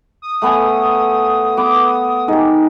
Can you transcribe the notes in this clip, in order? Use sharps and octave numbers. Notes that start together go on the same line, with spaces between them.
D#6
A3 B3 G#5
B3 D6
G#3 D#4 G4